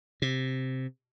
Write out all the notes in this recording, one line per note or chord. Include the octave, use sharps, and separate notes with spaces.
C3